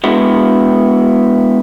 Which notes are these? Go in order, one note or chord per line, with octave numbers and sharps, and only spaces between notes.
G#3 B3 D4 E4 F#4